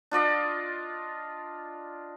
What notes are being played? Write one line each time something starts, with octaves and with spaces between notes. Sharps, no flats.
D4 F4 D5 D#5